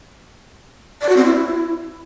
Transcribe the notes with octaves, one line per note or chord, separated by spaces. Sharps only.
D5
F#4
C4
E4